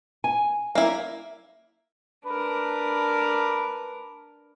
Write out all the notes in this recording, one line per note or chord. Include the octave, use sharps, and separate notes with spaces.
G#5
A#3 E4
D4 A#4 B4